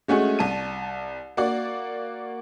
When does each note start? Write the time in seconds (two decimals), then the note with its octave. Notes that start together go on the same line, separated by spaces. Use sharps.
0.08 G#3 A3 C#4 F#4 G#4
0.39 C2 A5 D#7
1.37 A#3 F#4 D5